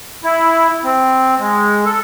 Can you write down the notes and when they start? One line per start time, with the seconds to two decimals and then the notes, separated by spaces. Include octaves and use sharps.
0.24 E4
0.84 C4
1.39 G#3
1.85 A4